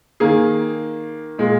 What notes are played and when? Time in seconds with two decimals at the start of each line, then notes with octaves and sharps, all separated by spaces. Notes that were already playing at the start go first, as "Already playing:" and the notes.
0.20 D#3 A#3 G#4
1.38 A#2 G#3